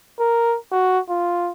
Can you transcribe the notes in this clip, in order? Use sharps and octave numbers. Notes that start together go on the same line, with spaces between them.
A#4
F#4
F4